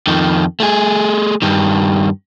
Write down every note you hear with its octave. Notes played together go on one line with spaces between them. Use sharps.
F2 D#3
A3 G#4
G2 D#3